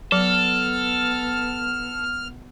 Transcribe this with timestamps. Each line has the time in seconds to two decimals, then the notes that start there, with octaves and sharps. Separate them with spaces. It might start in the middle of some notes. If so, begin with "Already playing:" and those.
0.12 F#3 B3 A4 F6